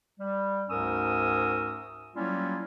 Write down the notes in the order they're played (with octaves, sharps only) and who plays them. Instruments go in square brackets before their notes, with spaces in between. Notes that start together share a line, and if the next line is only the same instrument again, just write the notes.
[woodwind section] G3
D2 G#2 C#4 A#4 D#6 E6
F#3 G3 A#3 C#4 E4 F4